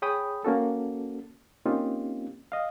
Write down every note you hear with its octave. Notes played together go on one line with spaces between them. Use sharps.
G#4 C#5 G5 B5 D#6
A#3 C#4 F#4 A4
A#3 C4 C#4 D#4 F4 G4
D#5 F5